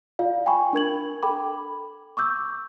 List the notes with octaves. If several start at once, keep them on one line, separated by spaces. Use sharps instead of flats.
F4 D5 F5
G5 G#5 B5 C#6
D4 A#4 G#6 F#7
A4 G5 B5 D6
C#6 D6 E6 G6